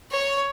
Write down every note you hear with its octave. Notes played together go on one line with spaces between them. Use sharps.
C#5